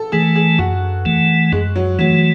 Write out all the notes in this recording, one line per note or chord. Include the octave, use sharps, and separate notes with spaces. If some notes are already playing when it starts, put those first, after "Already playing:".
Already playing: A4
E3 A3 G#4
G#4
F#2 F#4
E3 A3
F#2 G#3
F#3
E3 F#3 A3